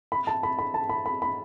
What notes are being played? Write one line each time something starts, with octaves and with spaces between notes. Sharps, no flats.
B5
A5
B5
B5
A5
B5
B5
B5